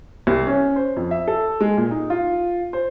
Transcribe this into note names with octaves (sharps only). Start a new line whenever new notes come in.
C2
C#4
C5
F2
E5
A4
G#3
A#2
D#4
F4
C5